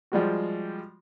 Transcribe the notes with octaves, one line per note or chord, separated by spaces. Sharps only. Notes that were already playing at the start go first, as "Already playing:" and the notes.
F3 G3 G#3 F#4